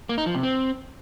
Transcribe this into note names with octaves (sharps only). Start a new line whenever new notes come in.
A#3
D#4
F3
C3
C4